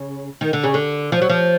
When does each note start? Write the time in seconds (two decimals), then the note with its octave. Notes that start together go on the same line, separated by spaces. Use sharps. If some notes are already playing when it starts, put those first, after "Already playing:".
Already playing: C#3
0.41 D#3
0.53 D3
0.64 C#3
0.74 D3
1.12 F3
1.22 F#3
1.29 F3